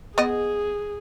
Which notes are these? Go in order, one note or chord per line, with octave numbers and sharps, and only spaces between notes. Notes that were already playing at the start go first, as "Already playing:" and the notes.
B3 G#4 D#5